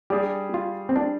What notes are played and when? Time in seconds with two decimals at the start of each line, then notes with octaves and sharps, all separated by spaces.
0.10 G3 D4 G4 G#4
0.54 F4
0.89 C4
0.96 D4